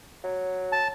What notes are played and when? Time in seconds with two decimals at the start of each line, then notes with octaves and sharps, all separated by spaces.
0.24 F#3
0.72 A5